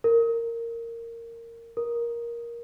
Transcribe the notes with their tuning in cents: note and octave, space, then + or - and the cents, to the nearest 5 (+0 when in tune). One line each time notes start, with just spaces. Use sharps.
A#4 -15
A#4 +10